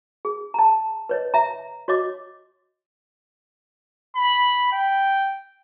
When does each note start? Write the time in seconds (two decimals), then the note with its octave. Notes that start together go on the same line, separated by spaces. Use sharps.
0.25 G#4
0.54 A5 A#5
1.09 B4 C#5 D#5
1.34 E5 A#5
1.88 F#4 C#5 D#5 D6
4.16 B5
4.72 G5